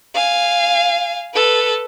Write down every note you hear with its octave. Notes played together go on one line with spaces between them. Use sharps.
F5 G#5
A4 B4